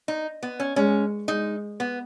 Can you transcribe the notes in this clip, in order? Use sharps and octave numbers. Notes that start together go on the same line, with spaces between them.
D#4
B3
C#4
G#3 C#4
G#3 D#4
B3